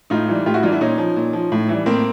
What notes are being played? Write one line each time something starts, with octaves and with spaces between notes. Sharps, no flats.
A2 D#4 F4
E3 G3
A2 F4 G4
E4 F#4
E3 G3 D#4 F4
D4 E4
A#2 C#4 D#4
F3
A#2
F3
A2
E3 G3
A2 A#3 C4